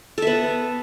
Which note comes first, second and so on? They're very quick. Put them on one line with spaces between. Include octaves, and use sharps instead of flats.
A4 E5 B3